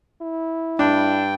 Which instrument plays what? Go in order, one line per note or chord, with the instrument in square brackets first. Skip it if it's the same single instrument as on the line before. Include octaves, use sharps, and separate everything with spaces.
[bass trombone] E4
[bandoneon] G2 G5 [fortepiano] D4